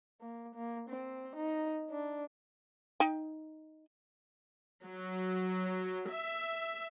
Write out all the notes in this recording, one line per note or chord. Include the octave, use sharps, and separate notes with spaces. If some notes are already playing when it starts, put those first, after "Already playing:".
A#3
A#3
C4
D#4
D4
D#4 G5
F#3
E5